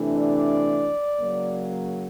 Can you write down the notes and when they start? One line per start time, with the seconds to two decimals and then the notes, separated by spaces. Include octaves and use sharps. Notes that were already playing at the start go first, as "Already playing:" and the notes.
Already playing: C3 E3 A3 D4
0.18 D5
1.19 C#3 F#3 A#3